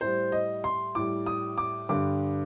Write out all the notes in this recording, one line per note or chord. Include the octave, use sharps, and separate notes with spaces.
A2 G3 C5
D#5
C6
A2 G3 D6
D#6
D6
G2 D3 G3 D6